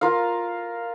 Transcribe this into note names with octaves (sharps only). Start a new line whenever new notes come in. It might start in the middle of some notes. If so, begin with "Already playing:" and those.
F4 A#4 F5